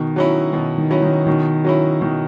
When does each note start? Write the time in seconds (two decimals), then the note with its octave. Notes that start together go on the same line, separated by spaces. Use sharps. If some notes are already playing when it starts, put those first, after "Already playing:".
Already playing: B2 D#3
0.16 F#3 C#4 E4
0.53 B2 D#3
0.78 D#3
0.90 F#3 C#4 E4
1.02 D#3
1.27 B2 D#3
1.64 F#3 C#4 E4
2.01 B2 D#3